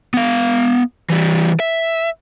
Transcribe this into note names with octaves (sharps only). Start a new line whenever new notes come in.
B3 F5
E3 G3
E5